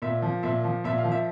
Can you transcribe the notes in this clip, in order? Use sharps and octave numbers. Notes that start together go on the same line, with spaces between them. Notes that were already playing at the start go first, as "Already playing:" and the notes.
A#2 E5
F3
A#2 E5
F3
A#2 E5
F5
F3
E5